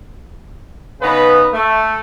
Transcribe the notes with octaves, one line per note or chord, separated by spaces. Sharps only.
C#3 B3 D#4 B4
A3